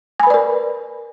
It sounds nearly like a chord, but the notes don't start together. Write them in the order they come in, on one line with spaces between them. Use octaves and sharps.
G#5 B5 B4 D5 A#4